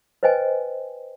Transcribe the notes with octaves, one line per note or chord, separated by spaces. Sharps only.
B4 C5 D#5 G5 G#5